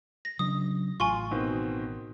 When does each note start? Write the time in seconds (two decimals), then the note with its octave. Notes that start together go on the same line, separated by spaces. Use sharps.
0.25 A#6
0.39 C#3 F#3 D4 D#6
1.00 A1 F4 G#5 C6 C#6
1.31 B2 D#3 C4